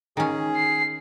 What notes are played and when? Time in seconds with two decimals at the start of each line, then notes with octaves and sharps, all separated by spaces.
0.17 D#3 C#4 G#4
0.56 C7